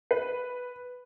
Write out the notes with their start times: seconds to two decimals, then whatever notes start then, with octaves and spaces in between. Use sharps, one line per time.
0.11 B4